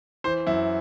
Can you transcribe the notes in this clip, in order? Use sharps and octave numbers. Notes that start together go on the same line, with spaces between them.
E3 C5
F#2 E4